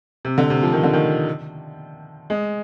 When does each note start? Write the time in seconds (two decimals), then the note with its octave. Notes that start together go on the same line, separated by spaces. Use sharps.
0.25 C3
0.38 D3
0.50 C3
0.63 F3
0.73 D#3
0.83 D3
0.93 D#3
2.30 G#3